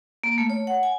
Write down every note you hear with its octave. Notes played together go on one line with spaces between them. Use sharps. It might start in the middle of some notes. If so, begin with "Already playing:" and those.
A#3
A3
C#5
F#5
G#5